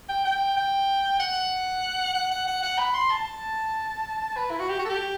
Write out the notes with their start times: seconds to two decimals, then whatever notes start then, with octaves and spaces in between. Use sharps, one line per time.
0.09 G5
0.25 G5
0.56 G5
1.20 F#5
2.14 F#5
2.31 F#5
2.47 F#5
2.62 F#5
2.78 B5
2.94 C6
3.10 A5
4.37 B4
4.50 E4
4.59 F#4
4.69 G4
4.79 F#4
4.85 A4
4.89 G4